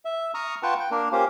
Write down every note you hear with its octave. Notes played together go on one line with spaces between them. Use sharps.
E5
A#5 C#6 D#6 F6
F4 B4 F#5 G5 A5 C#6
G5
A#3 D4 A#4
A#3 C#4 F4 G4 C5 F5